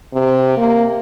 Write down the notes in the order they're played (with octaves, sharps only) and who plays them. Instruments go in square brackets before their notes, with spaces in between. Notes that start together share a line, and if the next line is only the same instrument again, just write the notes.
[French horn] C3
A#3